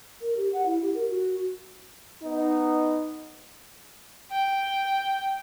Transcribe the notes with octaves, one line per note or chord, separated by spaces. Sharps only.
A#4
G4
F#5
E4
G4
A#4
F#4
B3 D#4
G5